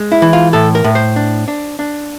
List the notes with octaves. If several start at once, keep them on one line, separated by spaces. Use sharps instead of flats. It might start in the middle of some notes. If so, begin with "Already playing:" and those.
Already playing: G#3
E4
E3
F4
A2 A4
A#4
A2
C5
D4
D4
D4